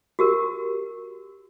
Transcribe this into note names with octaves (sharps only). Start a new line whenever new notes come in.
F#4 G4 A#4